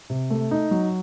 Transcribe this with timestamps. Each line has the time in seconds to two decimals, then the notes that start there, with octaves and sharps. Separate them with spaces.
0.10 C3
0.30 A3
0.51 D#4
0.71 F#3